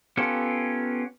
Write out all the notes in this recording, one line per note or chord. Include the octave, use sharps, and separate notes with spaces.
B3 C#4 F4 G4 A4